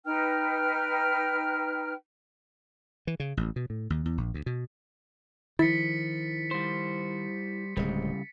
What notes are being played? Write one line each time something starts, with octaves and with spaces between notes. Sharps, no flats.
D#4 B4 G5 F6
E3
C#3
A1
B2
A2
D#2
E2
A#1
D2
B2
D#3 F3 E4 A6 B6 C#7
G3 C5
D1 C#3 G3 G#3